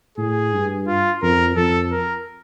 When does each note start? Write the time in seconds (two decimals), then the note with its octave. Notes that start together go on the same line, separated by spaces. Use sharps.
0.17 A2 G#4
0.53 G2
0.87 F4
1.22 F2 A#4
1.56 F2 A4
1.91 A#4